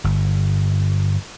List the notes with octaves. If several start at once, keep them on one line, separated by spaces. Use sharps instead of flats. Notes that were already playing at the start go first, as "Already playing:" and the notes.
G1